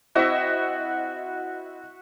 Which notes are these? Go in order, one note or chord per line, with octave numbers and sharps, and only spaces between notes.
C4 E4 F#4 D#5 E5